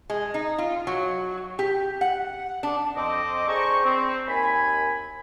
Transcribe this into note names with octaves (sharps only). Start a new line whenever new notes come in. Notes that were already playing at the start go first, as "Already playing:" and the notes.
G#3
D#4
F4
F#3
G4
F#5
D4
F2 C4 D#5 D6
D4 G#4 C5 G5 A#5 C#6
C4
D#2 G#5 B5